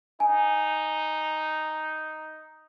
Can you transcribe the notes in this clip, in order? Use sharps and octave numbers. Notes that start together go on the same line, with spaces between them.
D#4 G#5